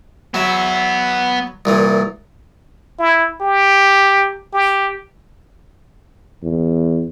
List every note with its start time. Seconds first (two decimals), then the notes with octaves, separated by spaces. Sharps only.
0.34 F#3 B3 E5
1.65 C2 A#2 E3
2.99 E4
3.41 G4
4.54 G4
6.43 E2